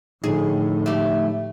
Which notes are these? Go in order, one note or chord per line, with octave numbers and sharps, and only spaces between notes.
A2 D3 F3 D#4 G#4
A3 G4